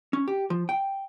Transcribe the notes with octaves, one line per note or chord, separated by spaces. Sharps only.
C#4
G4
F3
G5